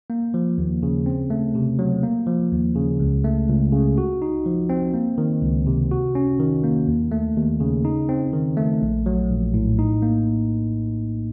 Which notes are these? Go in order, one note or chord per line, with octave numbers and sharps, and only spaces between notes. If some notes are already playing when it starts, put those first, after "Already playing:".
A#3
F3
D#2
C#3
C4
A3
C3
F#3
A#3
F3
D#2
C#3
C#2
A3
C#2
C#3
F#4
D#4
F3
C4
A#3
D#3
C#2
C3
F#4
C#4
D#3
A#3
D#2
A3
D#2
C#3
D#4
C4
D#3
A3
A#1
F#3
A#1
A2
D#4
A#3